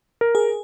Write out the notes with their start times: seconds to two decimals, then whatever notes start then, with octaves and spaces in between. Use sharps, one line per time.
0.21 A#4
0.35 G#4